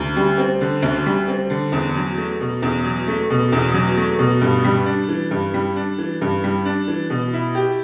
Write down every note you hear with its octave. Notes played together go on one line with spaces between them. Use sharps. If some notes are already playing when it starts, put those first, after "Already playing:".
Already playing: D2
G3
C4
D3
D2
G3
C4
D3
E2
F#3
A3
B2
E2
F#3
A3
B2
E2
F#3
A3
B2
G2
G3
D4
E3
G2
G3
D4
E3
G2
G3
D4
E3
B2
E4
G4